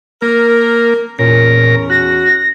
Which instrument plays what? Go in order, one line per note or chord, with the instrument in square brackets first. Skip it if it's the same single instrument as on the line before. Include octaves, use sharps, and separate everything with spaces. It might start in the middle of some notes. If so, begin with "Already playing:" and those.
[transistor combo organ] A#3 [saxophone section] A#4
[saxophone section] E2 C#4 [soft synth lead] A#2 [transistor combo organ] A#4
[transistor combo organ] F#4 [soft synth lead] A#6